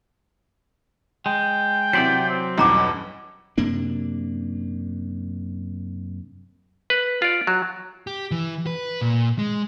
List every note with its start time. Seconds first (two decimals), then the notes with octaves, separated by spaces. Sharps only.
1.26 G#3 G5
1.93 C3 E3 F#3 C5 D5 B6
2.29 C4
2.58 B1 E2 G2 C#4 A#5 D6
3.58 F#2 C3 A#3 D4
6.90 B4
7.22 F4 D5
7.47 F#3
8.07 G4
8.31 E3
8.66 B4
9.01 A#2
9.39 G#3